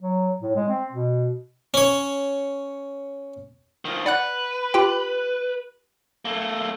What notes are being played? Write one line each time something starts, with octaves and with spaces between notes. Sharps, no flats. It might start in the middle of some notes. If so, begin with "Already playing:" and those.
F#3
A2
G#3
C4
B2
C#4 C#5
D#3 F3
B4 D5 F#5 F#6
F4 G4 G5
A3 A#3